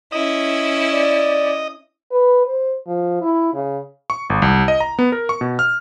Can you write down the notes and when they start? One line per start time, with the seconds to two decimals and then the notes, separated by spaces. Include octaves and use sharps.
0.12 C#4 E4 D#5
0.92 D5
2.12 B4
2.47 C5
2.87 F3
3.21 E4
3.54 C#3
4.10 C#6
4.30 G#1
4.42 C2
4.68 D#5
4.80 A#5
4.99 B3
5.12 A#4
5.29 C#6
5.41 B2
5.59 F6